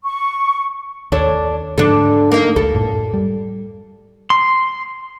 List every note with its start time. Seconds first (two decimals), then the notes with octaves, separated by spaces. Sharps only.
0.04 C#6
1.12 D#2 D4 A4 C#5
1.78 G#2 D3 F3 D4 A4
2.32 A#3 D#4
2.56 C#2 A4
2.75 F#2 A2
3.14 G3
4.30 C6